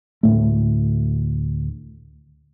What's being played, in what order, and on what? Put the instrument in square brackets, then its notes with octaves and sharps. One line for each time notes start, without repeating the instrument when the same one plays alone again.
[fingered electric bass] D2 A2 A3